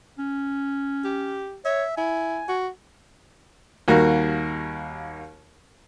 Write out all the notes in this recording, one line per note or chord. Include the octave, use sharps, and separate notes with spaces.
C#4
G4
C#5 E5
E4 G#5
F#4
D#2 G3 A#3 F#4 A#4